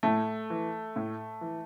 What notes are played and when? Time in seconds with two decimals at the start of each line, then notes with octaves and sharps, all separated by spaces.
0.03 A2 A3
0.50 E3
0.96 A2
1.41 E3